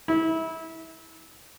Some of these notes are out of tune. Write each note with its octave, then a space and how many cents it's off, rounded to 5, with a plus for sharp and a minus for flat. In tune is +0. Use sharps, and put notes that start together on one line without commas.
E4 -25